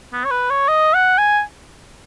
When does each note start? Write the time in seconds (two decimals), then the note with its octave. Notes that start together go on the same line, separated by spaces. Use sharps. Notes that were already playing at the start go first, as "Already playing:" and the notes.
0.13 B3
0.25 C#5
0.31 B4
0.50 C#5
0.68 D#5
0.94 F#5
1.18 G#5